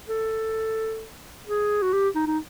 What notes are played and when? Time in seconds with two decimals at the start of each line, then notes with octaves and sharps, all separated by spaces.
0.09 A4
1.47 G#4
1.82 F#4
1.93 G4
2.15 D#4
2.27 D#4